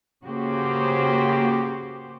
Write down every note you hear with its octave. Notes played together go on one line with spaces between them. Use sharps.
C#3 A#3 F#4 G4 C5